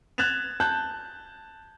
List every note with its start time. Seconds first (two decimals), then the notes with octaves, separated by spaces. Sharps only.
0.18 F#6 G#6 A6 E7 F7
0.60 A5 F#6 G6